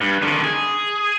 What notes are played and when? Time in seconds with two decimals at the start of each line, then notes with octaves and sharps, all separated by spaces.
0.01 G2
0.22 D3 D#3
0.44 G#4